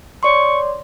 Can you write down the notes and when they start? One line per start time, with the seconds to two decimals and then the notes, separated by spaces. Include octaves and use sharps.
0.23 C#5 D5 C6 C#6